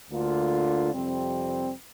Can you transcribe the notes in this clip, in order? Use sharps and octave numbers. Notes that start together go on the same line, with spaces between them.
D2 D3 A#3 F4
F2 C3 G3 C4